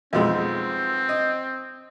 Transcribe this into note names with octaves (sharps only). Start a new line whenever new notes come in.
B1 F2 G#3 C4
D#5